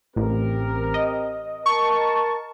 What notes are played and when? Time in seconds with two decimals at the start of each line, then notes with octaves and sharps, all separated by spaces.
0.16 A1 C4 G4 A#4
0.94 D#5
1.66 A#4 A5 C#6